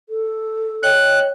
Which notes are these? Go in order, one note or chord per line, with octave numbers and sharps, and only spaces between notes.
A4
C#5 D#5 G5 F#6